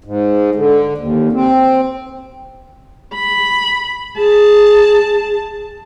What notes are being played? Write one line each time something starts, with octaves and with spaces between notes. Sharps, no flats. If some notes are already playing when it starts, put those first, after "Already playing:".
G#2
D3
D#2
C4
B5
G#4 A5